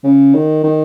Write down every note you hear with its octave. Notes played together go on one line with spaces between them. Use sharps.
C#3
D#3
D#3